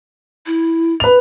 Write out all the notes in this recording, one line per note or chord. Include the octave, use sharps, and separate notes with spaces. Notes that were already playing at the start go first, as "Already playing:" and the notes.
E4
B4 F7